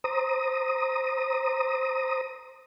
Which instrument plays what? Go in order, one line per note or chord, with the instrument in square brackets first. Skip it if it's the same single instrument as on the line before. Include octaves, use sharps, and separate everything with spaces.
[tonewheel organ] C5 A#5 D#6